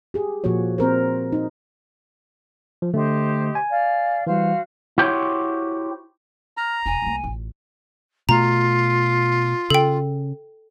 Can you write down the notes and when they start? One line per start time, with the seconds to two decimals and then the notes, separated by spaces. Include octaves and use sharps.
0.14 G4 G#4
0.44 A#2 F3 A#3 F#4 C#5
0.78 C4 A#4 C5
1.32 D#4
2.82 F3
2.94 D3 A3 G4 C5 D#5
3.55 G#5
3.69 D5 F5
4.27 E3 G3 F#4 C5 F5
4.98 E4 F#4 G4 C5 C#5
6.57 A#5 F6
6.86 E1 F4 G#5
7.02 C2 A#3
7.24 A1 F4
8.29 B2 A3 F4 A#5
9.70 C#3 A4 G5